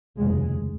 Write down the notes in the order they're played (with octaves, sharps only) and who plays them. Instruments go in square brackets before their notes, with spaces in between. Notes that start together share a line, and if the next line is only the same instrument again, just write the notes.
[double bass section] F1 D#2 C#3 G#3